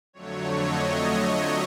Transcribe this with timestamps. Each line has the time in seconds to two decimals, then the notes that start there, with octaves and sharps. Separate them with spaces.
0.13 F2 D3 F#3 A3 C#5
0.58 D#5